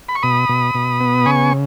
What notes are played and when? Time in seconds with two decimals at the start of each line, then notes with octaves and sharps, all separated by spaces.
0.09 B5
0.15 C#6
0.23 B2 B5 D#6
0.49 B2
0.75 B2
1.01 B3
1.26 C#3 G#5 C#6